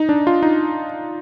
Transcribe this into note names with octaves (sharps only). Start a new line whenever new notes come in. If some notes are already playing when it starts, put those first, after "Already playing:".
Already playing: D#4
D4
F4
D#4